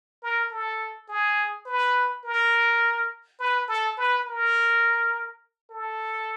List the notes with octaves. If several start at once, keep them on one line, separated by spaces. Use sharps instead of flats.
A#4
A4
G#4
B4
A#4
B4
A4
B4
A#4
A4